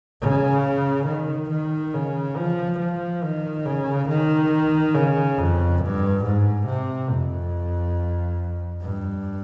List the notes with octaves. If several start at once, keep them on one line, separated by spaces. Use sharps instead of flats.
C#3
D#3
D#3
C#3
F3
F3
D#3
C#3
D#3
C#3
F2
G2
G#2
C3
F2
G2